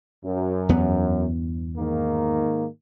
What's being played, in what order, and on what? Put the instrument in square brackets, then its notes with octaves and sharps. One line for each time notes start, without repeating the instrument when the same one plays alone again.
[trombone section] F#2
[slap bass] E2 G2 B3
[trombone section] G#2 D#3 A#3